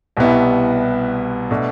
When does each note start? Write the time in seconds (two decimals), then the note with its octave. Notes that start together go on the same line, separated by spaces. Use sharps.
0.17 C2 B2 G3 B3 E4
1.51 B2 A3 D4